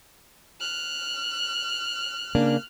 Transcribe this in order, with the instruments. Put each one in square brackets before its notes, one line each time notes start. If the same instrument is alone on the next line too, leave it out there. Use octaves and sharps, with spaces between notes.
[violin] F6 F#6
[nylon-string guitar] C#3 A#3 D4